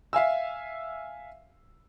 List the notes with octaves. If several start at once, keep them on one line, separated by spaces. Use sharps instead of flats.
E5 F5 G#5 E6